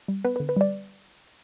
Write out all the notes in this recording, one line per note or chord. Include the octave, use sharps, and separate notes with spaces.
G3
B3 B4
D3 B4
B4
G3 D5